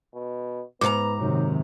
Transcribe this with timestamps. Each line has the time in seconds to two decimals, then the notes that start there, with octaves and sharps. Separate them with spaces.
0.14 B2
0.81 G#2 B3 G#4 A#5 D6
1.20 F#2 C3 D#3 F#3